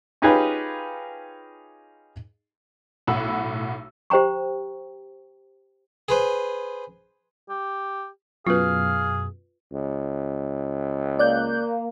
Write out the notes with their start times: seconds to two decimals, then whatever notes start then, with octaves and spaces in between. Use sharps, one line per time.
0.22 C#4 D#4 F4 G4 G#4 B4
3.07 B1 A2 F#5 B5 E6
4.10 G4 C5 G5 A#5 C#6
6.09 G#4 B4 C5
7.50 G4
8.47 F#2 B2 F4 G#4 B4 F5
9.73 C#2
11.19 A#3 D5 F#6 G6